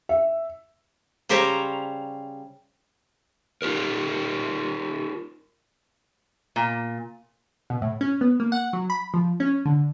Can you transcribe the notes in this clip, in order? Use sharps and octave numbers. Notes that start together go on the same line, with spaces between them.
E5
C#3 G3 G4 C5 C#5 A#5
D#4 F4 G4 A#4
A#2
B2
A2
C#4
B3
A#3
F#5
F#3
B5
F3
C#4
D3